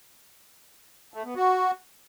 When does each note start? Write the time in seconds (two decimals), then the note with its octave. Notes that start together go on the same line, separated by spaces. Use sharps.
1.14 A3
1.25 B3
1.36 F#4